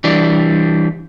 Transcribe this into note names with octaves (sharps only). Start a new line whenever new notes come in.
E3 G3 D4